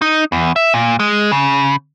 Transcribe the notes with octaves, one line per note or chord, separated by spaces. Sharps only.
D#4
E2
E5
A#2
G#3
C#3